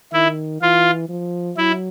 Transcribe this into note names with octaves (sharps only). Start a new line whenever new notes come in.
D#3 E4
E3 F4
F3
F#3 E4